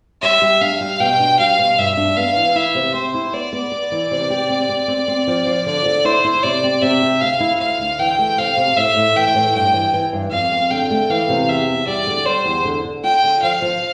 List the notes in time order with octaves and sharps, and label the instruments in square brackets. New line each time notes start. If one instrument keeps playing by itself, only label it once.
[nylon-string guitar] G3 [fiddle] E5
[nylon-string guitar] G3
[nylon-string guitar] D4 [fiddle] F5
[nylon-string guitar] G3
[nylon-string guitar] B2 [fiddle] G5
[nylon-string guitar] D4
[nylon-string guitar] G3 [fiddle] F5
[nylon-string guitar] B2
[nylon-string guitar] G2 [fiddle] E5
[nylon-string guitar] D4
[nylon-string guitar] B3 [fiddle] F5
[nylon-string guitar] E3
[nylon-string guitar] E4 [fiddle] E5
[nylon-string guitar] C3
[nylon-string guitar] C4 [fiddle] C5
[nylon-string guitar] E4
[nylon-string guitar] B3 [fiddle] D5
[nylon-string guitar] B3
B3
E3
C3
G4
C4
C4
C4
C4
F3
F3
[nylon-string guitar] D3 [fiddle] D5
[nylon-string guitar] D3
[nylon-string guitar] E4 [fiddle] C5
[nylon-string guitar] E4
[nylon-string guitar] C3 [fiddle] D5
[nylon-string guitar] C4
[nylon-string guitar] C3 [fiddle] E5
[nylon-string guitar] G4
[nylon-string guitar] D2 [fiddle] F5
[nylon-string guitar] E4
[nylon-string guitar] D2 [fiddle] F5
[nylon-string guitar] D2
[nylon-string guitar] E3 [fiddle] G5
[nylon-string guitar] A3
[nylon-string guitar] C3 [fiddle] F5
[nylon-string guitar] C3
[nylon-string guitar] A2 [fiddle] E5
[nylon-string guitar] A2
[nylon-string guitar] E3 [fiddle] G5
[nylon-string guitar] A2
[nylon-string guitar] G2 [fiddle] G5
[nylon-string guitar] E3
E3
G2
[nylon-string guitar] F2 [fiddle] F5
[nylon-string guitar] C4
[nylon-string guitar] D3 [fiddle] G5
[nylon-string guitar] A3
[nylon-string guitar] E3 [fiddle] F5
[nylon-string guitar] C3
[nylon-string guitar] E2 [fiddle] E5
[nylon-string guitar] E2
[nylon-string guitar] G3 [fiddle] D5
[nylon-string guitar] D3
[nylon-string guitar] G3 [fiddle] C5
[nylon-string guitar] E2
D3
D3
[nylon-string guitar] F4 [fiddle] G5
[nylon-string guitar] D3
[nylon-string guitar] F3 [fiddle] F5
[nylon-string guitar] F3